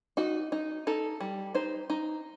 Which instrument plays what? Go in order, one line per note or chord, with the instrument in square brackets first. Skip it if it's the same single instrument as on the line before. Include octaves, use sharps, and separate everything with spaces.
[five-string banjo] D#4 F#4
D#4
D#4 A4
G3
D#4 C5
D#4